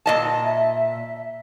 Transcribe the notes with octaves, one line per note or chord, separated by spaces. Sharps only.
A#2 D#5 A5
E5